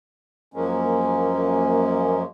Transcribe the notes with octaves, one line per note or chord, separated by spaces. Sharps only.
F#2 F3 G#3 A#3 C#4